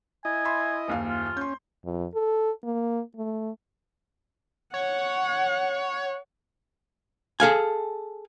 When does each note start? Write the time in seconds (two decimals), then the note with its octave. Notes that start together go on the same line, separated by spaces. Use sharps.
0.25 E4 D#5 G#5
0.45 E5 B5 C6
0.88 F#1 D#2 F5
1.09 F4
1.37 C#4 C6 G6
1.85 F2
2.15 A4
2.64 A#3
3.16 A3
4.74 C#5 F#5
7.40 G#4 A4 F5 G#5